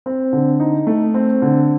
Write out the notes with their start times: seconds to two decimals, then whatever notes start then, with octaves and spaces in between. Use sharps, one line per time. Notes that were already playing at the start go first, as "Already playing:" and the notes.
0.06 C4
0.33 D3
0.60 D#4
0.87 A3
1.14 C4
1.42 D3